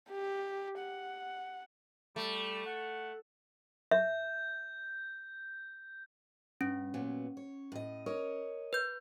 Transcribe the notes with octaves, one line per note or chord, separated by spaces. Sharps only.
G4
F#5
G3 A3
F#5
E5 G6
G2 C#4
A#2 F#3 B3
C#5
A2 D#5
A#4 C#5 D#5
B4 G6